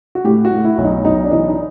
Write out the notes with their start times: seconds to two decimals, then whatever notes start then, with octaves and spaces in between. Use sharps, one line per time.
0.15 F#4
0.24 A2 G4
0.45 F#4
0.51 A2
0.64 E4
0.78 B1
0.84 D#4
1.04 B1 D#4
1.24 D4
1.31 E3 D#4
1.49 D#4